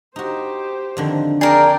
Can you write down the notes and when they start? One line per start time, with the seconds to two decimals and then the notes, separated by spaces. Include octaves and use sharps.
0.16 D#4 F#4 G4 C5
0.97 F2 D3 D#3
1.41 D4 G#4 A#4 D5 G5